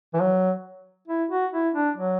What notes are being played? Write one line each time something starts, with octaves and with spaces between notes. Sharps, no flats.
E3
F#3
E4
F#4
E4
D4
F#3